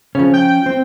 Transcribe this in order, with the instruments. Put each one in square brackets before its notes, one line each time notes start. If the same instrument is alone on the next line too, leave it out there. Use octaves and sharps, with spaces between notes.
[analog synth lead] C#3 [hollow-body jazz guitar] F3 C#4
[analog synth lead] G5
[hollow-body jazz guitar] C4